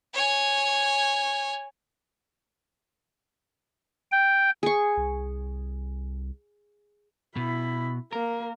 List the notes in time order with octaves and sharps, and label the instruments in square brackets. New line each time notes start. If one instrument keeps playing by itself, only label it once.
[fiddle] C#5 G#5
[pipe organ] G5
[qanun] G#4 C#6
[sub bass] C2
[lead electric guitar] B2 [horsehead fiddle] E4 B5
[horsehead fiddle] A#3 [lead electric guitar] A#4